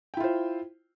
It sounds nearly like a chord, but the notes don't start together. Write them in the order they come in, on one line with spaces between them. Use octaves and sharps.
G5 E4 F4 C5